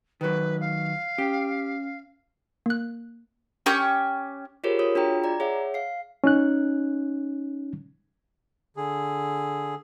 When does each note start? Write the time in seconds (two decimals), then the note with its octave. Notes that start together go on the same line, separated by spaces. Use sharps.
0.21 D#3 F#3 B4
0.60 F5
1.18 C#4 G4
2.66 A#3 F#6
3.66 C#4 G4 C#6 G6
4.64 F4 G4 G#4 A#4 C5 C#5
4.79 F4 C#5 D#6
4.95 D4 F4 F#4 G#4 G5 A#5
5.24 D5 A#5
5.40 G#4 C#5 E5 F#5
5.74 F5 C7
6.24 C#4 D#4 F#6
8.77 D3 G#4